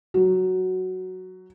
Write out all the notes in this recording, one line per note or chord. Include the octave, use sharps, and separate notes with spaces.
F#3